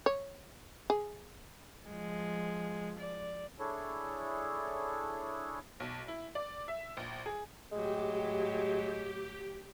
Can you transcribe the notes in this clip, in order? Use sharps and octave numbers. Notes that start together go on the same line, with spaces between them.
C#5
G#4
F3 G#3
D5
D4 E4 G#4 A4 C#5
B1
E4
D5
E5
A#1
G#4
A2 F#3 G#3 G4